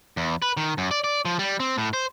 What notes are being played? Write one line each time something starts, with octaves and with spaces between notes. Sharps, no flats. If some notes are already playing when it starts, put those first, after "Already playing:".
E2
B4
D#3
F#2
D5
D5
F3
G3
C4
A2
C5